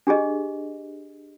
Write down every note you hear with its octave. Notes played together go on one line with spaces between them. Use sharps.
D4 G4 G#4 D#5